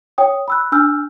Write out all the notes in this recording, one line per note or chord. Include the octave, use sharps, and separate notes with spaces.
C#5 G5 D#6
B5 E6 F#6
D4 G#5 E6 F6 G6